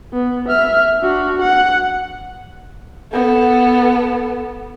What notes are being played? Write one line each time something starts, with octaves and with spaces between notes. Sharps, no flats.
B3
E5 F6
D4 F#4
F#5
B3 A4